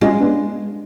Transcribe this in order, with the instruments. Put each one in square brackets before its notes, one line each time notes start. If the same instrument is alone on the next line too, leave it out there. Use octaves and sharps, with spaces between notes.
[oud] G#3 [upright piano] C#4 F4
[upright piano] B3 D4